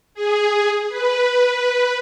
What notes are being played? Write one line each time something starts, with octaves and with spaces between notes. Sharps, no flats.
G#4
B4